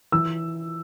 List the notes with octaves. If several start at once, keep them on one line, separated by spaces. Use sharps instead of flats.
E3 E6